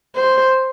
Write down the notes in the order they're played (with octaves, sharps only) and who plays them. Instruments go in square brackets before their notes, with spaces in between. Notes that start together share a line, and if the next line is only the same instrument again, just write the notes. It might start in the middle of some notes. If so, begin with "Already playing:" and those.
[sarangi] C5